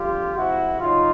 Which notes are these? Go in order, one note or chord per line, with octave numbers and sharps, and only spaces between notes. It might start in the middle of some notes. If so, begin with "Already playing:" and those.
Already playing: F2 D3 G3 F4 G4
C3 F3 G#3 E4 F#4
C#3 F#3 D#4 F4